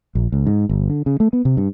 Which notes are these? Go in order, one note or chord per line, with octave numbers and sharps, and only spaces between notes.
A#1
C#2
G#2
G1
D3
C#3
A3
B3
C3
G2